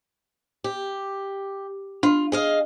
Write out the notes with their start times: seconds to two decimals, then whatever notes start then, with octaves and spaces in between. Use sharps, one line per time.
0.64 G4
2.03 D4 F4
2.32 G#4 D#5 F5